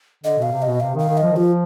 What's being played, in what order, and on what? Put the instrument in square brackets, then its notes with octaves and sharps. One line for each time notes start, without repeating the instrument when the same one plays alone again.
[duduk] D3 [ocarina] D#5
[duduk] B2 [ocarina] F5
[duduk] C3
[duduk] B2 [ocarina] D#5
[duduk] C3 [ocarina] F5
[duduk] D#3 [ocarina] F5
[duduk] D#3
[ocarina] D#5
[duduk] F3
D#3
[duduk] F3 [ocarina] F4